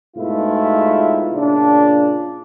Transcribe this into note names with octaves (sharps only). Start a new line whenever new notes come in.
G#2 B2 A3 E4 F4
A#2 C#3 D4